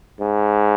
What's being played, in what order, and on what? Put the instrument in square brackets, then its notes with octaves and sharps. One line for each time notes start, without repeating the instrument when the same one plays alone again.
[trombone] G#2